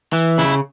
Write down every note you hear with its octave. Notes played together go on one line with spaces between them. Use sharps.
E3
C#3 E4